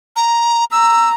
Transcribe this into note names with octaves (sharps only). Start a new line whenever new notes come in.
A#5
A#5 E6